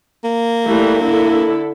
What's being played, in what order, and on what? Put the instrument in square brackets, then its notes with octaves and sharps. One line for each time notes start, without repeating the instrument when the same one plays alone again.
[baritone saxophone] A#3
[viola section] E3 G3 A3
D3 E4 A4